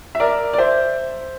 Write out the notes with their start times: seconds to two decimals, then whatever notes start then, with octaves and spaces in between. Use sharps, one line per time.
0.15 E5
0.20 A#4 D5
0.53 D5
0.58 C5 E5